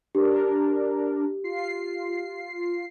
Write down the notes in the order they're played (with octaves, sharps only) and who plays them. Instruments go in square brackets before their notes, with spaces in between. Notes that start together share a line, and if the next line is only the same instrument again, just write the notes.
[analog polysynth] D4 A#4 [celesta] G4
[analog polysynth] F4 C7